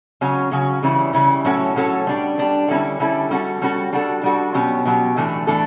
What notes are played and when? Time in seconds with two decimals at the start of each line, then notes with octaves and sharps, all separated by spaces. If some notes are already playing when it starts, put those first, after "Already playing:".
0.21 C#3 F#3 C#4 F#4
0.51 C#3 F#3 C#4 F#4
0.82 C#3 E3 G3 C#4 E4
1.13 C#3 E3 G3 C#4 E4
1.45 A2 F#3 C#4 F#4 A4
1.76 A2 F#3 C#4 F#4 A4
2.07 G3 D4 G4
2.38 G3 D4 G4
2.68 D3 G3 C#4 E4 A4
3.00 D3 G3 C#4 E4 A4
3.31 G3 C#4 F#4 A4
3.62 G3 C#4 F#4 A4
3.93 G3 D4 F#4 A4
4.23 G3 D4 F#4 A4
4.54 B2 F#3 C#4 G4
4.85 B2 F#3 C#4 G4
5.17 A2 E3 A3 D4 A4
5.47 A2 E3 A3 D4 A4